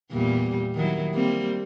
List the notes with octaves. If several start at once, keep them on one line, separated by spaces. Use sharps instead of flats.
E2 A#2 G3
D#3 F#3 E4
G3 A#3 C4